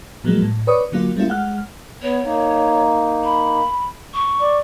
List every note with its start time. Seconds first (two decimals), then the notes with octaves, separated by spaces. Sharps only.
0.24 A#2 F3 F#3 G#3 A#3
0.42 A2
0.67 B4 C#5 D5 C#6 D#6
0.92 D3 F#3 A#3 F4
1.16 G3 A3 A#3 C#4 E4 F4
1.28 G#3 F#5 F6
2.02 B3 C#5
2.24 A#3 D#4
3.24 B5
4.13 C#6
4.41 D5